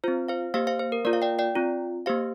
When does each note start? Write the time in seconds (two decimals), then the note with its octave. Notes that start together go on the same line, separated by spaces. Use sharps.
0.04 C4 F4 C5
0.28 C5 F5
0.54 A#3 G4 C5 F5
0.67 C5 F5
0.80 C5
0.92 A#4
1.05 A#3 F4 A#4 D5
1.13 F5
1.22 D5 G5
1.39 D5 G5
1.55 C4 F4
2.06 A#3 G4 C5 F5